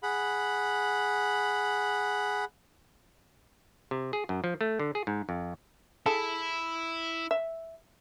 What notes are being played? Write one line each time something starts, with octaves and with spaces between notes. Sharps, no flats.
G#4 F#5 B5
C3
G#4
F#2
F3
A3
D3
G#4
G#2
F2
E4 G#4 A4
E5